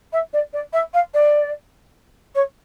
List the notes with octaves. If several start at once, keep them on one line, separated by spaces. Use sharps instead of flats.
E5
D5
D5
E5
F5
D5
C#5